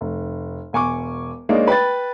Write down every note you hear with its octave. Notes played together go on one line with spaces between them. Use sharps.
F1
E1 G#5 C#6 D6
G#3 A#3 D4 D#4 C#5
B4 G5 B5 A6